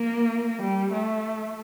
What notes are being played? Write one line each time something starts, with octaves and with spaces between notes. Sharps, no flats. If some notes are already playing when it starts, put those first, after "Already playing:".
Already playing: A#3
G3
A3